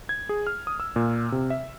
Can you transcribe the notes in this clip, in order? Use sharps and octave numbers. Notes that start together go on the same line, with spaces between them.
G#6
G#4
F6
D#6
E6
A#2
C3
E5